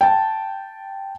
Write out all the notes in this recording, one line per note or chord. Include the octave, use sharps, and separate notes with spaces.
G5 A5